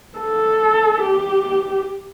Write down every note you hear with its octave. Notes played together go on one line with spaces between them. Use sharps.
A4
G4